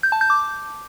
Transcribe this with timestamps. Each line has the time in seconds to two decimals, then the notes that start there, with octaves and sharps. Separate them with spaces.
0.03 G6
0.12 A5
0.21 G6
0.30 D6